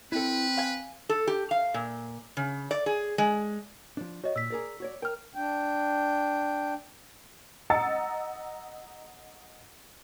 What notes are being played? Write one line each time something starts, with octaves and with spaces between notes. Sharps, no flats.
C4 E4 A4 B4
F5 G#5
A4
G4
F5
A#2
C#3
D5
G#4
G#3
F3 D4
F#4 C#5 D#5
A#2 E6 B6
G#4 A#4 D5
F#4 C#5 D5
A#4 G5 F6
D4 G5
D#5 F#5 A#5 E6 A6 C#7